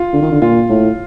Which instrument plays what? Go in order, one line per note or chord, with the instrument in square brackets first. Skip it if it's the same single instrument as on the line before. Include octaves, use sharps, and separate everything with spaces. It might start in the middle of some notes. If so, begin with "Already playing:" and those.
Already playing: [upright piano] F4
[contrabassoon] D3
D#3
D3
[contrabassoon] A#2 [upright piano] F4
[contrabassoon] A2